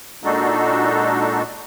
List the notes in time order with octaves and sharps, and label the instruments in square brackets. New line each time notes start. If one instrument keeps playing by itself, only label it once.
[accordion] A#2 G#3 D4 D#4 F#4 A4